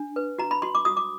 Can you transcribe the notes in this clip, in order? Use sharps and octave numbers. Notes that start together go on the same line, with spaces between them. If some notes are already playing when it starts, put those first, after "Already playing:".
Already playing: D4
B4
F#4 A#5
B5
F#4 C6
D6
F#4 D#6
D6